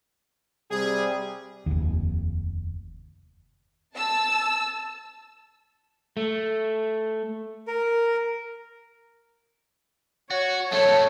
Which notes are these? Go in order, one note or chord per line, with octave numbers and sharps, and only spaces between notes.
C3 G3 G#4
F1 D#2
A5 E6
A3
A#4
F#4 C#5
F#2 A3 C#5 A5